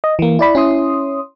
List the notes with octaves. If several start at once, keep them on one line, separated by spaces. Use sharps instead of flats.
D#5
E3 A#3
E4 D5 B5
C#4 E4 C6 D#6